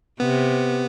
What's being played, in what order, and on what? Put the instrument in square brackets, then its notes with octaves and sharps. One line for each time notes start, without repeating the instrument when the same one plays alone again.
[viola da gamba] C3 [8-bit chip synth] B3